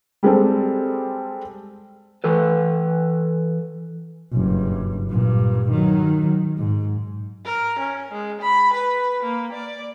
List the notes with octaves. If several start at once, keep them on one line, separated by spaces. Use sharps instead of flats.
G3 G#3 C4 A4
E3 A4 B4
F#1 G2
G2 A#2
D#3 F#3
G#2
A#4
C#4
G#3
B5
B4
A#3
D5